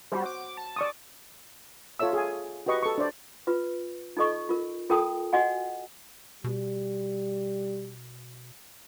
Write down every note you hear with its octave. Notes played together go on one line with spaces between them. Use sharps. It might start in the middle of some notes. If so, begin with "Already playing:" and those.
G3 F#4 C5
D6
A5
D5 C#6 D#6
F4 A4 C#5 E5 E6
G#4 G#5
F#4 G4 B4 D#5 C#6
A4 C#6
D4 C5 D5
F4 B4
D#4 F4 A4 D#5 C#6
F4 A#4
F4 A4 A#4 G5 A5 D#6
F#4 D#5 F#5 G#5
B2 G3